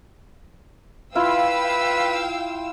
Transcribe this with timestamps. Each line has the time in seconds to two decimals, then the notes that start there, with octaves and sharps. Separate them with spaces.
1.15 E4 F4 B4 F5 G5 E6